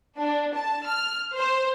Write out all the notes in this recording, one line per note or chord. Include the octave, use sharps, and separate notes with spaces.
D4
A5
F6
C5